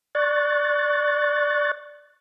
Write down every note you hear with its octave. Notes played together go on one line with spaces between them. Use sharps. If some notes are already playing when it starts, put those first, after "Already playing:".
D5 C#6 F#6 A6